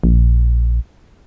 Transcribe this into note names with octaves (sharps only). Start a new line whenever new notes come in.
A#1